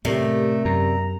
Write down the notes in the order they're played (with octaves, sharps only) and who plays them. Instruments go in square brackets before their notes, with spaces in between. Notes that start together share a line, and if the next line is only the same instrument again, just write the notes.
[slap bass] A2 [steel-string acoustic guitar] C3 [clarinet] A3 [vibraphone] G4 A#4 D5
[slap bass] F#2 [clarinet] A#5